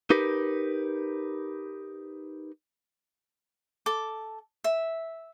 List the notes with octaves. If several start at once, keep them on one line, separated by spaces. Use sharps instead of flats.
D#4 G4 A#4 B4
A4 D6
E5